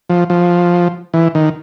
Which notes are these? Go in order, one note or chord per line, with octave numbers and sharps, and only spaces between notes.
F3
F3
E3
D#3